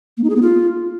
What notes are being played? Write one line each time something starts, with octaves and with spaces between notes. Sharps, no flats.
A#3
D#4
G#4
B3
F4